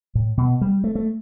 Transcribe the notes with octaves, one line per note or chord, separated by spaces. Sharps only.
A2
B2
G3
A3
A3